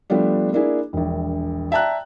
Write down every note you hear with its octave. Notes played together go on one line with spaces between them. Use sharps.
F3 G3 A3 B3 D4
A#3 D4 E4 G#4
E1 A#1
D5 E5 G5 A5 A#5 F#6